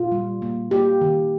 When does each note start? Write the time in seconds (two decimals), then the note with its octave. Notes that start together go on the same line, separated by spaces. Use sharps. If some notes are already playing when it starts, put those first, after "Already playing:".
Already playing: A#2 F4
0.12 G3
0.42 A#3
0.71 A#3 G4
1.01 D#3